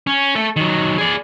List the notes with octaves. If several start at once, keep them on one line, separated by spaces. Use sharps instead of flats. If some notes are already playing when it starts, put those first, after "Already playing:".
C#4
A3 A4
D#3 F#3
G#4 D5